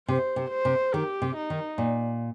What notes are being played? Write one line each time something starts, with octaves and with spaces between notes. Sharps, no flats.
C3 C5
C3
C5
C3
D#3 G4
C3
D#4
D#3
A#2